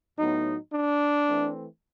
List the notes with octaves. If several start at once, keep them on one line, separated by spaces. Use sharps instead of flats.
A2 F#3 B3 D#4
D4
E3 A3 C4